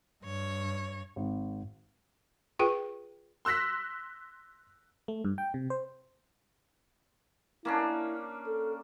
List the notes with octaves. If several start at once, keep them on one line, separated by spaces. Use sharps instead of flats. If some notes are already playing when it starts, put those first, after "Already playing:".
G2 C#5
G#1
F4 G#4 B4 G5
C6 E6 F#6 A#6 B6
A3
G2
G5
C3
C5
A#3 C#4 D4 E4
A4